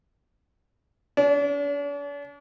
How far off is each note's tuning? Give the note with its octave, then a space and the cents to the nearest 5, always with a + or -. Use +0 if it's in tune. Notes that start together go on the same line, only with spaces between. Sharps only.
D4 -45